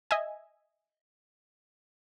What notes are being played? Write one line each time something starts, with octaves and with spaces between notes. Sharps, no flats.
D#5 E5 G#5